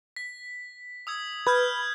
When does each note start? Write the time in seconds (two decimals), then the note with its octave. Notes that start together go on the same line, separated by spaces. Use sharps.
0.16 B6
1.07 D#6 E6 G#6
1.47 B4 F6 G6 G#6